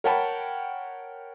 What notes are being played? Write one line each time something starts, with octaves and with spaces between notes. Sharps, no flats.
A#4 C#5 F#5 G5 A5 B5